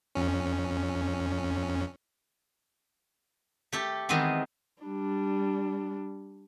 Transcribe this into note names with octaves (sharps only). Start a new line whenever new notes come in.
F2 C#4
A3 G4 A4
D#3 E3 G#3 B3 C4
G3 D4